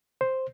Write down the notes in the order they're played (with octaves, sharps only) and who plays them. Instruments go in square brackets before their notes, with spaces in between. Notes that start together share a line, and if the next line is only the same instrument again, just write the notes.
[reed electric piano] C5